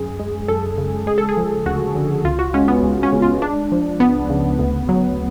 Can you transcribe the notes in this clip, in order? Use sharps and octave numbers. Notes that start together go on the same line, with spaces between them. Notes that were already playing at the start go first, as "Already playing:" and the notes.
Already playing: F#2 G#4
G#3
F#2 A4
C#3
G#3 G#4
A4
G#4
F3
D2 F#4
D3
C#2 F4
F#4
G#3 C#4
B3
C#2
C#4
C#3
F4
G#3 D4
F3
C#2 B3
C#3
D2
F#3